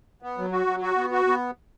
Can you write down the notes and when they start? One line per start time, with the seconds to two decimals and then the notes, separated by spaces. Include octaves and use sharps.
0.22 B3
0.38 F#3
0.52 F#4
0.67 F#3
0.82 F#4
0.97 B3
1.12 F#4
1.27 B3